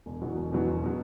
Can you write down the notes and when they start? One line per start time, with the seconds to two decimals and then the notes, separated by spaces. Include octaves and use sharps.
0.06 E1
0.22 E2 B2 F#3
0.37 E1
0.52 E2 B2 F#3
0.66 E1
0.84 B2 F#3